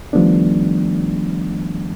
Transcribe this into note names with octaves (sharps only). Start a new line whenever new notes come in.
D#3 F3 G3 A3 B3 D4